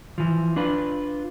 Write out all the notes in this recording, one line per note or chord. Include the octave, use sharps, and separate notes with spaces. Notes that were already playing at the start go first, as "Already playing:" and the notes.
E3 F3
D4 F4 B4